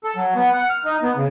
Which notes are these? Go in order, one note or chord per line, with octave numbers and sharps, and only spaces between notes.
A4
F#3
B3
F#5
F6
D#4
B3
C#3